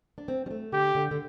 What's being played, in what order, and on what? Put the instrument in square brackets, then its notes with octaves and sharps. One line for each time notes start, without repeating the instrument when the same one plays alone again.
[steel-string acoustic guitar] D4
C4
G3
A3
[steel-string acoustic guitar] D3 [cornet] G4
[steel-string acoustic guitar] D3
D3